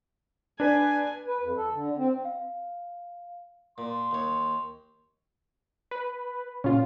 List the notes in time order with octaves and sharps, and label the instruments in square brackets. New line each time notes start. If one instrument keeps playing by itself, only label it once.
[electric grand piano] D4 B4 [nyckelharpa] G#5
[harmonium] B4
F2
A4
D3
C4
[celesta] F5
[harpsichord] A#2 [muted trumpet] C6
[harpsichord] D#2 C#5
[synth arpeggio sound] B4
[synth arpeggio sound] A#2 C#3 F4 [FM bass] C#4